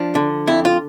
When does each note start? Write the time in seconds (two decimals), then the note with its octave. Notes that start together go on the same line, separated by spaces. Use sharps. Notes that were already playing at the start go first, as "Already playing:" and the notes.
Already playing: F3 D4
0.15 D3
0.47 F2 E4
0.65 F4